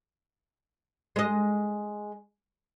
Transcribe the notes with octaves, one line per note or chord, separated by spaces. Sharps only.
G#3 D#5